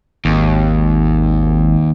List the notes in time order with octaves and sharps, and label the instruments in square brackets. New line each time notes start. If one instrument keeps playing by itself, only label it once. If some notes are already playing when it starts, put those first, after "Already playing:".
[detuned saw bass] G#1 [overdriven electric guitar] D#2